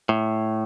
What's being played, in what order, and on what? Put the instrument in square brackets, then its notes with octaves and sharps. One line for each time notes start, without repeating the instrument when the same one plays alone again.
[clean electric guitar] A2